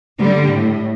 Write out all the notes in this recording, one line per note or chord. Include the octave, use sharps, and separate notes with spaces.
D3 G3
A2